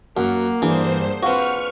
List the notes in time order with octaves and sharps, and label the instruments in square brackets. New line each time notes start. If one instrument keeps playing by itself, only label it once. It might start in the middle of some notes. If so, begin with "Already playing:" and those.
[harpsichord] F#2 [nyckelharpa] A#3 [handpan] F#5
[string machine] G2 C5 [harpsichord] E3 [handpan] D4 G#4
[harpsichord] C4 F#4 [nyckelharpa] B4 [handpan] C5 F5 [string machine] C#6 F6